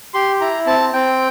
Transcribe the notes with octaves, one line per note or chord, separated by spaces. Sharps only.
G4 C6
E4 A#5
C4 A5
C4 G5